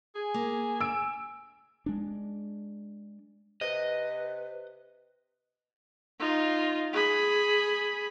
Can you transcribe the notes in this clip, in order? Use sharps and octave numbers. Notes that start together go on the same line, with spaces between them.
G#4 G#5
A#3
E6 D7
G#3 D4
C3 B4 D#5
D#4 F4
G#4 B5